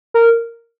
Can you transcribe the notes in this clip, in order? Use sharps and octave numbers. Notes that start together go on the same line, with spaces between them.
A#4